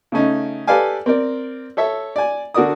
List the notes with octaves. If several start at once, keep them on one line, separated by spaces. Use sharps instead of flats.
C#3 A3 C#4 D#4
G4 A4 B4 D5 F5 G#5
C4 A#4 D5
A4 C#5 E5
D5 G#5
D3 F#4 A#4 D5 D#6